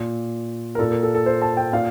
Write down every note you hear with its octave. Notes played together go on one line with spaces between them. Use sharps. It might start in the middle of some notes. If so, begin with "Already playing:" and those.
Already playing: A#2
A#4
A#2 A4
A#4
A4
A4
C5
A5
G5
A#2 F5